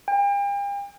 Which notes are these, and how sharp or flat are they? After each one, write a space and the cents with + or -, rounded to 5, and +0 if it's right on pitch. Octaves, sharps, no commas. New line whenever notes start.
G5 +45